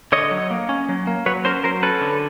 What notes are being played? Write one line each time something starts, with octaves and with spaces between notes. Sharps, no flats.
D3 C#5 D#5
F#3
A#3
C#4
F#3
A#3
F#3 B4 C#5
C#4 A#4 C5
F#3 A#4 C5
C#4 A4 B4
D3